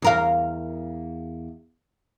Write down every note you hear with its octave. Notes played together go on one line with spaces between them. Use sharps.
E2 A#4 F5